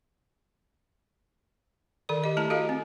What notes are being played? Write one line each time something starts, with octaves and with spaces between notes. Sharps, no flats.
D#3 A4 D5
G4 D#5
A3 E4 A5 A#5
F#4 A4 D#5 F5
C4